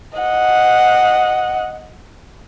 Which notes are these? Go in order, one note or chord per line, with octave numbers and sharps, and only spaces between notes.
D#5 F#5